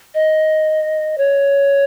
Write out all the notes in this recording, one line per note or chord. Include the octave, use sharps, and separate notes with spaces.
D#5
C#5